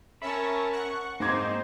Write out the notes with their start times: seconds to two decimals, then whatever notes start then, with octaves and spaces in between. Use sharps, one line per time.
0.22 C#4 A#4 E5 A5 B5 C#6
0.72 F#5 C#6 F#6
1.20 G#2 A#3 C4 D#4 C5 D6 G#6